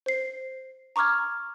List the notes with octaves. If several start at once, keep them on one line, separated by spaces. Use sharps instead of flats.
C5 C7
A#5 C#6 D6 F6 G#6